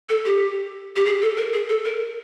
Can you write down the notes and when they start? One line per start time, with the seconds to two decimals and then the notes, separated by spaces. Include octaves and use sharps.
0.09 A4
0.25 G4
0.96 G4
1.05 G#4
1.22 A4
1.37 A#4
1.53 G#4
1.69 A4
1.85 A#4